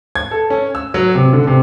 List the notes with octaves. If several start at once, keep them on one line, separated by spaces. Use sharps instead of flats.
G#6
A4
C#4
E6
F#3
C3
D3
C3